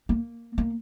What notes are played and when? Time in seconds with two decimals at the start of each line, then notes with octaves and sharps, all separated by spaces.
0.09 A#3
0.58 A#3